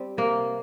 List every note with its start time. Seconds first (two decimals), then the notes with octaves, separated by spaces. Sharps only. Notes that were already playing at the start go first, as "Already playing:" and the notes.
Already playing: G3 C4
0.17 C3 A#3